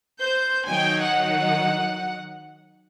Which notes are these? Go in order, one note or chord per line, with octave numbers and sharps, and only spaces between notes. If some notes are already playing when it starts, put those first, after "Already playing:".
C5 G6
D#3 F#3 D#4 G5 G#5
F#5